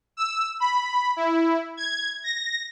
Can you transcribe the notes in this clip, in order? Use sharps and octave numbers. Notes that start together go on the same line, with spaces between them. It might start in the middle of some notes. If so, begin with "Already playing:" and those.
E6
B5
E4
G#6
A#6